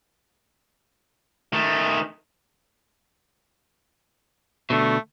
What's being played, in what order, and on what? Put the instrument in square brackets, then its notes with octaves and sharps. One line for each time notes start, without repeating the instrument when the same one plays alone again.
[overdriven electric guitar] D#3 A3
[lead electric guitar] B2 D3 [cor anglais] A3